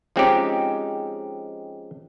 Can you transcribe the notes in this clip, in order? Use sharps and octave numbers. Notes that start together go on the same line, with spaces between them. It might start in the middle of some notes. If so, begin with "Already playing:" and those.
F3 G#3 C4 C#4 D#4 G4